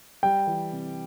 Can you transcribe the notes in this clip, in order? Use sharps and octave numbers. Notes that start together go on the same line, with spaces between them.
G3 G5
E3
C3